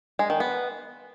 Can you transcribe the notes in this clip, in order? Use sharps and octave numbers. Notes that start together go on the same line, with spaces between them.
G#3
D#3
B3